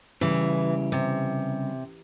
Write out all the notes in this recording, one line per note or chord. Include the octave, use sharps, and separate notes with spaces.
C#3 E3 G3
C3